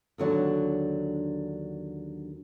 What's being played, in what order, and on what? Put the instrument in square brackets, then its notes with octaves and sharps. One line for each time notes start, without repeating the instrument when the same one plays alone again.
[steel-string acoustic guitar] D#2 D3 F#3 D4